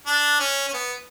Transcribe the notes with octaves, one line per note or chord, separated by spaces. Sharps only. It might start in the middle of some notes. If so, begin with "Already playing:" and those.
D4
C#4
C#4
B3